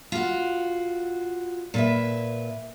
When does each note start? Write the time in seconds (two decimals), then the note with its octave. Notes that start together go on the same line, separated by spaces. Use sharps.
0.12 F4 F#4
1.74 A#2 B4 E5